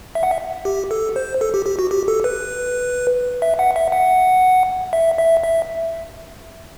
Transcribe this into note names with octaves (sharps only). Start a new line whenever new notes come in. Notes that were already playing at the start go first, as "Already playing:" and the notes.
E5
F#5
E5
G4
A4
C5
A4
G4
G4
F#4
G4
A4
B4
E5
F#5
E5
F#5
E5
E5
E5